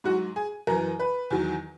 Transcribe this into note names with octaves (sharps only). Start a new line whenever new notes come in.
G#2 F#3 F#4
G#4
F#2 E3 A#4
B4
E2 D#3 F#3